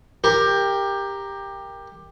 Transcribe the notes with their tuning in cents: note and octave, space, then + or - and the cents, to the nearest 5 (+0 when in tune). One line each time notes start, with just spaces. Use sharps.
G4 +15 A#4 +0